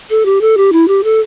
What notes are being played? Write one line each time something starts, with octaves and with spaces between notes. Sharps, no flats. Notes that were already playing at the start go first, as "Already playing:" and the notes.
A4
G4
A4
G4
E4
G4
A4